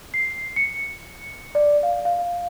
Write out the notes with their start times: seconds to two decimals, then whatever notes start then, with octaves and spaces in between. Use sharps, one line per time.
0.14 C7
0.56 C#7
1.55 D5
1.83 F5
2.05 F5